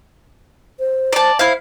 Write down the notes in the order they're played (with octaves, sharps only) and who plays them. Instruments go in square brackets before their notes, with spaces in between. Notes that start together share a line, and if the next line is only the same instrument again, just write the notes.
[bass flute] C5
[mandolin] D5 A5
[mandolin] E4 F5 [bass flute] C5